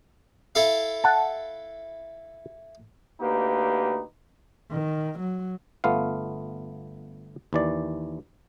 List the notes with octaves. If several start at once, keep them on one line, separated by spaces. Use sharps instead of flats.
E4 A4 F5
F#5 A5
D2 A#3 D#4 G4 B4
D#3
F#3
G1 A3 B3 F4 F5
D#2 E3 D5